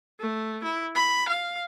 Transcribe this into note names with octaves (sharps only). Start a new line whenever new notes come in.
A3
E4
B5
F5